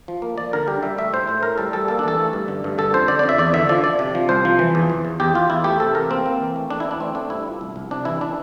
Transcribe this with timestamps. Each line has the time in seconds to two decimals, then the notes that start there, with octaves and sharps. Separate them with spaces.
0.08 F3
0.22 A#3
0.38 A#3 D5
0.53 D3 A#4
0.68 G3 G4
0.83 G3 E5
0.98 A3 E5
1.13 A2 C5
1.28 A2 C5
1.43 A3 A#4
1.58 G3 A4
1.73 G3 A4
1.88 A#3 A4
1.99 D4
2.04 E3 A4
2.19 A3
2.33 G2
2.48 D3
2.64 G2
2.78 D3 A4
2.94 F2 C5
3.08 D3 D5
3.19 D5
3.23 F2
3.29 E5
3.38 E2 D5
3.54 D3 E5
3.69 F3 D5
3.84 F3 D5
3.99 C3
4.15 F3
4.29 C2 C5
4.45 F3
4.59 E3
4.75 E2
4.90 E2
5.05 E2
5.20 E2 G4
5.35 E2 F4
5.50 E2 E4
5.64 A3 G4
5.80 C3 A4
5.95 E3 A#4
6.10 A#3 C4
6.26 A#3
6.40 E3
6.56 A3
6.70 E2 D4
6.80 E4
6.85 E3
6.91 D4
7.00 A3 C4
7.15 A3 D4
7.30 G2 E4
7.45 F3
7.61 C2
7.76 C2
7.91 C3 D4
8.05 E3 E4
8.21 E3 D4